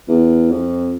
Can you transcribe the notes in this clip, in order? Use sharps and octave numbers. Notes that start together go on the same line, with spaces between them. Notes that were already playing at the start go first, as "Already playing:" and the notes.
E2
F2